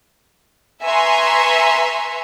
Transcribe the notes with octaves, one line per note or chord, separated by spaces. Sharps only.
B4 E5 G#5 A#5 C6 C#6